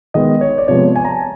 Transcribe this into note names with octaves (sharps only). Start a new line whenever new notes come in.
D#3 G#3 B3 D#5
C#5
D5
C3 F3 G#3 B3 C#5
G#5
A#5
A5